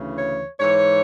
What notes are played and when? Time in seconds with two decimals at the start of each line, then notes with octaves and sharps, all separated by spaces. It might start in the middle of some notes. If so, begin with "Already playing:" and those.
Already playing: D2 C#3 E3
0.18 C#5
0.59 G#2 E3 C#5